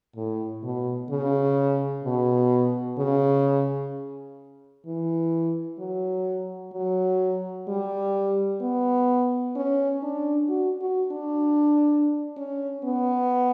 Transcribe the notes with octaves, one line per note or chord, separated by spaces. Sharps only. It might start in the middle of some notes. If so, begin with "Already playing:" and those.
A2
B2
C#3
B2
C#3
E3
F#3
F#3
G3
B3
C#4
D4
F#4
F#4
D4
C#4
B3